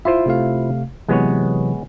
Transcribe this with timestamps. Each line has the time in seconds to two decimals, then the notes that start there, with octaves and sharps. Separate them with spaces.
0.05 E4 F4 C5 E5
0.26 C3 A3 F5
1.08 C3 E3 F#3 G#3 B3 C#5